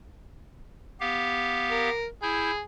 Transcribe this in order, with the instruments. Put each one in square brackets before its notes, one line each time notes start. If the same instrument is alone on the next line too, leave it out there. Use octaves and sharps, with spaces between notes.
[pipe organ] B3 G4 F5
[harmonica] A#4
[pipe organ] E4 G6 [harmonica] G#4